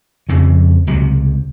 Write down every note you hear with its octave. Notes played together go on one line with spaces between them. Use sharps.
F2 C#3 F3
C#2 C3 F#3